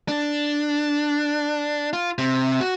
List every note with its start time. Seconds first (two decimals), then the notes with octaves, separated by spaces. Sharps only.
0.08 D4
1.93 F4
2.18 C3
2.61 F#4